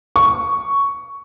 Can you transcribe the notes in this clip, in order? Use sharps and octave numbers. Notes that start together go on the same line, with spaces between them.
C#6